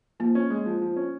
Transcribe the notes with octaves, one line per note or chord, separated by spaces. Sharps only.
F3 A#3
C#4
G#3
F3
F3
C#4